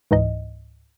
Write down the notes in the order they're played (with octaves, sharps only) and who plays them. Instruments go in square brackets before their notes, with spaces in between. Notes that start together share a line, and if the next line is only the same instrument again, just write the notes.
[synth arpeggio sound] C#2 G#2 E3 D#4 D#5